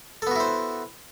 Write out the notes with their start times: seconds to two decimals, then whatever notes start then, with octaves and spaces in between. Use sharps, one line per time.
0.22 A4
0.27 B3
0.31 F#4
0.36 E4
0.40 C5